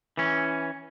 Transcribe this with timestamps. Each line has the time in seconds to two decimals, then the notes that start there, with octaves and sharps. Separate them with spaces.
0.17 E3 C#4